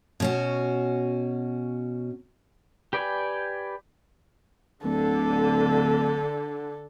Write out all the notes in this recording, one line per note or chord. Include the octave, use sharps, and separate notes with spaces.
B2 C#4 F#4
G4 B4 D5 G5 G#5
D1 D3 A4